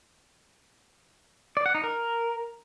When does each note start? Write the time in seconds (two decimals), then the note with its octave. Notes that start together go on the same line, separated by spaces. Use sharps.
1.57 D5
1.66 F#5
1.75 D#4
1.83 A#4